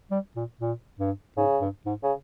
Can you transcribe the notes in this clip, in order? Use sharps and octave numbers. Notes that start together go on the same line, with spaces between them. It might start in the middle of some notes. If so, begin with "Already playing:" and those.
G3
A#2
A#2
G2
G#2 C#3
G2
G#2
C#3